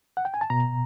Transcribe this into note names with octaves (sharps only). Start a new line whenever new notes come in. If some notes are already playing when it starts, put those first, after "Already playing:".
F#5
G5
G#5
A5
B2 A#5